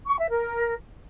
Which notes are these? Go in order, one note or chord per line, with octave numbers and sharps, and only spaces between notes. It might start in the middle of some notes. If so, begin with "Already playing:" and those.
C#6
E5
A#4